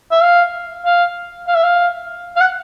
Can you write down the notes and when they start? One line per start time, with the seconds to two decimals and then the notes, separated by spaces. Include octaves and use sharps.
0.11 E5
0.23 F5
0.85 F5
1.47 F5
1.55 E5
1.63 F5
2.36 F5
2.40 F#5